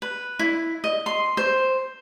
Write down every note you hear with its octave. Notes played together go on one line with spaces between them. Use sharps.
B4
E4
D#5
C6
C5